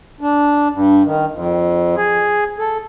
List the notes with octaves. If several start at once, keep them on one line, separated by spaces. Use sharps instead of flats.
D4
G2
D#3
F2
G#4
A4